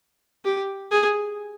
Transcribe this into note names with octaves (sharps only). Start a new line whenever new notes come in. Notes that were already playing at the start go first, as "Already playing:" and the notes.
G4
G#4